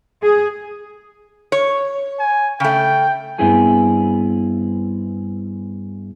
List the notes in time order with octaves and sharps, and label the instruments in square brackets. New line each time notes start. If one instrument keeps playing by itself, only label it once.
[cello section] G#4
[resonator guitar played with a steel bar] C#5
[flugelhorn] G#5
[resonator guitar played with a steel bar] C#3 A3 [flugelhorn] G5
[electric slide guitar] G2 B3 C4 E4 G#4 G#5